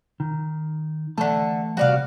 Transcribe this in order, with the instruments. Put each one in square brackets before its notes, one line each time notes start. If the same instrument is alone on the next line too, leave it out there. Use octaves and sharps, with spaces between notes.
[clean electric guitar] D#3
[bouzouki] D3 A4 [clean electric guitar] E3 A3 A5
[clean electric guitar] C3 G3 [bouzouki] F#4 D5 F5